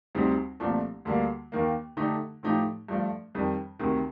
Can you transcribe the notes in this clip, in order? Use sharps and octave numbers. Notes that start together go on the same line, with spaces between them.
D2 C3 G3 C4 D#4
C2 A#2 F3 A3 D4
D2 D3 G3 A#3
D#2 D#3 A#3
D3 A3 D#4 G4
A2 F3 A3 D#4 G4
G2 F3 A3
F2 D#3 G3
D2 C3 D#3